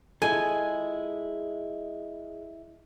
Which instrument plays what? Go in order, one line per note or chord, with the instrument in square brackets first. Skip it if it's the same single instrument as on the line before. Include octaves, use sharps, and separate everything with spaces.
[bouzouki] G#3 [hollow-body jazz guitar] E4 F4 A4 [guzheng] G#5